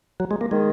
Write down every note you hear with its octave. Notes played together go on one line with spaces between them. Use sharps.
F#3
G#3
A#3
D#3 G#3